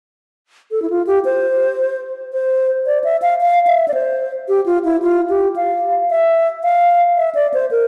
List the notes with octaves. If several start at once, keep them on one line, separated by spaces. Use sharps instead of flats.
A4
E4
F4
G4
C5
C5
D5
E5
F5
F5
E5
D5
C5
G4
F4
E4
F4
G4
F5
E5
F5
E5
D5
C5
A#4